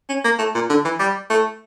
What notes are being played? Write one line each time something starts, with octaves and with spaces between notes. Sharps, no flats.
C#4
A#3
A3
A#2
D3
E3
G3
A3